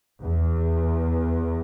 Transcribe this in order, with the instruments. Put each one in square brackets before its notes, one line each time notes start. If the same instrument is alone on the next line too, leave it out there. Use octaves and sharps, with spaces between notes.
[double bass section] E2